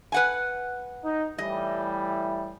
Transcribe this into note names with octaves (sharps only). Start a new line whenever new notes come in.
B4 F#5 G#5
D#4
A2 E3 G3 D#5